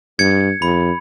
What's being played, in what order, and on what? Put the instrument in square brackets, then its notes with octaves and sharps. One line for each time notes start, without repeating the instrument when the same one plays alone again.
[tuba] G2 [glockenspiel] G#6 C#7
[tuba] F2 [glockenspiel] B5